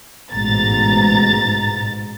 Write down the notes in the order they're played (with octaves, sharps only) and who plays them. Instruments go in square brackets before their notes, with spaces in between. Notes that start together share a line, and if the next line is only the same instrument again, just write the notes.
[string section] A1 G#2 B2 A#5 A6